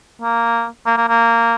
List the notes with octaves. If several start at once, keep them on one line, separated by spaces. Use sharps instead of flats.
A#3
A#3
A#3
A#3